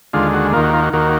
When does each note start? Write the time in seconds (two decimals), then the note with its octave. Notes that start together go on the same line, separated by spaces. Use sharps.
0.13 D#2 D3 G#3 F4
0.33 F#4
0.53 D#2 D#3 A#3 F4
0.63 F#4
0.73 F4
0.82 F#4
0.93 D#2 D#3 A#3 F#4